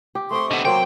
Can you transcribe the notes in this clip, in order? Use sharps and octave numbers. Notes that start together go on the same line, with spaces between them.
G4
A3 C4 G4 C6 C#6 D#6
D3 B3 D#5
F#3 A#3 C4 G5 C6